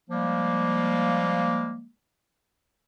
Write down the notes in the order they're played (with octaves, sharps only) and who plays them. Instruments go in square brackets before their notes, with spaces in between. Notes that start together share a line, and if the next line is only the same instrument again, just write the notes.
[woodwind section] F3 G3 G#3 A#3